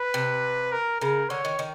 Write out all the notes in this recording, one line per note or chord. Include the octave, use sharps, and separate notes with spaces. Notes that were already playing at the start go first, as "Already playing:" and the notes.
Already playing: B4
C3
A#4
C#3 A#4
D3 C#5
D#3
D#3